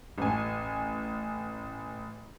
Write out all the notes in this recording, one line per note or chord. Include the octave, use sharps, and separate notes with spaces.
A1 G#5